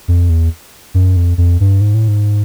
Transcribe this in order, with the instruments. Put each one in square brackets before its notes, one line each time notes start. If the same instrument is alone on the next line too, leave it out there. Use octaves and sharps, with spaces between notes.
[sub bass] F2
E2
F#2
F2
F2
G2
G#2
A2
G#2